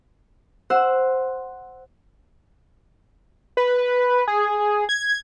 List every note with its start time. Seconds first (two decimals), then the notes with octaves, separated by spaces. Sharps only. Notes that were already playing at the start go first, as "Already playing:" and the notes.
0.70 C5 F#5 E6
3.57 B4
4.28 G#4
4.89 G#6